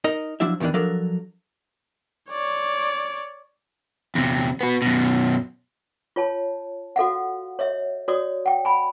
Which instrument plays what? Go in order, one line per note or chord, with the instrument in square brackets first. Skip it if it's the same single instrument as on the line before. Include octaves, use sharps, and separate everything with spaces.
[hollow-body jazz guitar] D#4 A#4 D#5
F3 F#3 D4 E4 E5
E2 B2 D#3 E3 D4
F3 F#3 D4 A4 A#4
[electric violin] C#5 D5
[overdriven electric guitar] E2 C3
B3 F#4
F#2 B2
[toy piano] F4 C#5 A5
F#4 A4 F5 F#5
C#5 D#5 E5
F#4 C#5 D5 D#6
F#5 G5
G#5 B5